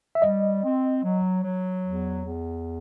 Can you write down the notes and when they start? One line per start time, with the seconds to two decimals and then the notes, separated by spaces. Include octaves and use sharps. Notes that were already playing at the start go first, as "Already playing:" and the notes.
0.15 E5
0.22 G3 D#5
0.63 C4
1.04 F#3
1.44 F#3
1.85 E2
2.25 E2